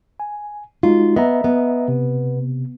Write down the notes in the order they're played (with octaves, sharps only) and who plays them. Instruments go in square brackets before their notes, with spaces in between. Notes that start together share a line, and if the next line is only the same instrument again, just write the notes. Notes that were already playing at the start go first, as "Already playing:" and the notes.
[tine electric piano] G#5
[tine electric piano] G#3 D#4 F#4 [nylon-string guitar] F4
[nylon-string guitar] B3 [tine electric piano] D#5 E5 A#5
[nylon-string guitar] B3
[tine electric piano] C3